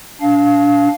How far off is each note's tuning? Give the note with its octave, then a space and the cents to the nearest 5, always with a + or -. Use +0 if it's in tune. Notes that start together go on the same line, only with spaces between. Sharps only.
D4 -25 F5 +0